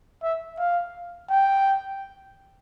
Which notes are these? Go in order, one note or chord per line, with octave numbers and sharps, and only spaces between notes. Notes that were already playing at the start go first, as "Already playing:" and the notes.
E5
F5
G5